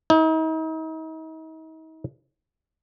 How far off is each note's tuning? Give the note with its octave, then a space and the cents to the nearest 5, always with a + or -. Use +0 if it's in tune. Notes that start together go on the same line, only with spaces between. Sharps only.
D#4 +40